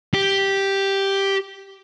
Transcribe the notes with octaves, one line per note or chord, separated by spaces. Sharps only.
G4